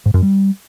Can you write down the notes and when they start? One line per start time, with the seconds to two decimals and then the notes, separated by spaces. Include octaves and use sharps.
0.06 G#2
0.14 F#2
0.22 G3